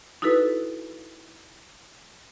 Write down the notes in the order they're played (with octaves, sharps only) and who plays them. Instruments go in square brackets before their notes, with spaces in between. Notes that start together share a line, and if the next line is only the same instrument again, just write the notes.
[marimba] D#4 E4 F#4 A4 B4